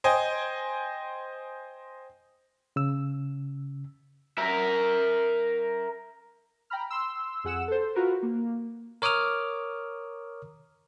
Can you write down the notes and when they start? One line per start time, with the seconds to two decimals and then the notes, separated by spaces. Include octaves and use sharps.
0.04 C5 D#5 G5 G#5
2.76 C#3 E6
4.38 A#4 E5
6.70 G5 A#5 B5 F6
6.90 C6 E6
7.44 F2 G#4 F#5 E6 E7
7.68 A4 C5
7.95 F4 F#4 A#4 B4
8.22 A#3
9.02 A#4 C#5 D6 D#6 F6